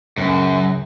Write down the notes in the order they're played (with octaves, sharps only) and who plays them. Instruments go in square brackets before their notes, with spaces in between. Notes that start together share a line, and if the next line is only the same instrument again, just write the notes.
[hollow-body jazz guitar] C#2 A2 C#3 [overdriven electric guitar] F#2